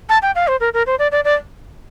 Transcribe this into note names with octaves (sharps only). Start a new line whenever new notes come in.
A5
G5
F5
C5
A#4
A#4
C5
D5
D5
D5